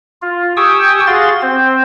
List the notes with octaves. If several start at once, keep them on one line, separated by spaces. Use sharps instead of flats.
F4
G4 G5 G#5 C#6 D#6 E6
F#4 G#4 F5 C6 A6
C4 C5